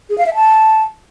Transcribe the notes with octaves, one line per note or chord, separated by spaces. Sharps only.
G#4
F5
E5
A5